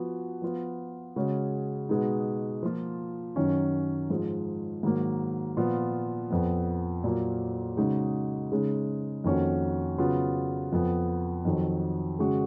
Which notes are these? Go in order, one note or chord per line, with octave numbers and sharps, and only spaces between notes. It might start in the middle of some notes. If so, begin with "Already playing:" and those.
Already playing: F3 B3 F#4
F3 B3 F4
C#3 G#3 C#4 F#4
B2 G#3 B3 D#4
F3 A#3 F4
F#2 D#3 F#3 C#4
G#2 F3 G#3
G#2 D#3 F#3 A#3
A#2 F3 B3 F4
F2 F3 B3
A#2 F#3 A#3
C#3 G#3 D#4 F#4
C#3 G#3 D#4
F2 D#3 A#3 C#4 F#4
C#3 F#3 B3 F4
F2 F3 B3
F2 D#3 F#3
C#3 G#3 C#4 F#4